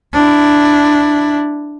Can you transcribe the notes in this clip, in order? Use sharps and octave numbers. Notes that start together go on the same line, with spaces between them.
D4 E4